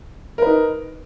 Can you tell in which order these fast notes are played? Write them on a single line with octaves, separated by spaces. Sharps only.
A#4 B4 D#4